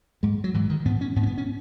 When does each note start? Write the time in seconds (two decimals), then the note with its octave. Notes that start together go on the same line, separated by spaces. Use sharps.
0.23 G#2 G#3
0.44 F#3
0.54 G#2 E3
0.70 D#3
0.85 G#2 B3
1.01 C#4
1.16 G#2 B3
1.23 C#4
1.27 B3
1.38 C#4